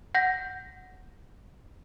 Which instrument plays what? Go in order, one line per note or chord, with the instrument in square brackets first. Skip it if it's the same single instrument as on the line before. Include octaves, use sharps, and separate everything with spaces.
[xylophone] F#5 G6 A#6